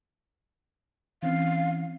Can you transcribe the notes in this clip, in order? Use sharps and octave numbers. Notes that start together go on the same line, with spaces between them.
E3 C4 C#4 F5